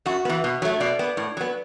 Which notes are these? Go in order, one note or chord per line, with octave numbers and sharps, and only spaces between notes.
F#2 F#4
E3 B3
B2
F#3 A3
B2 D5
B3
A2
F#3 B3